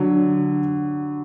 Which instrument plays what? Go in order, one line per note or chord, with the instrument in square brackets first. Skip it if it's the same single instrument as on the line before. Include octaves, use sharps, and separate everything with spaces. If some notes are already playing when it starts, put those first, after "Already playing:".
Already playing: [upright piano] D3 F#3